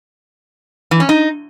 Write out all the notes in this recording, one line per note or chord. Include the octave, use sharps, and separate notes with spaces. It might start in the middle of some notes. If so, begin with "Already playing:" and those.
E3
C#4
D#4